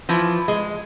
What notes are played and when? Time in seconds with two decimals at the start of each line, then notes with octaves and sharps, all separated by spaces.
0.09 E3 F3
0.48 G#3